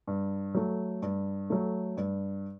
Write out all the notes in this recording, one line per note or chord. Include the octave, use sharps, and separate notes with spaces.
G2
F#3 A3
G2
F#3 A3
G2